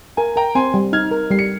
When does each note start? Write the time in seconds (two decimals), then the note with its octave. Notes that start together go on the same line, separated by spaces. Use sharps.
0.17 A#4 G#5
0.36 A#4 G5 A#5
0.55 C4 G#5 C6
0.74 G3
0.93 D#4 F6 G#6
1.11 A#4
1.31 G3 C7
1.39 C#7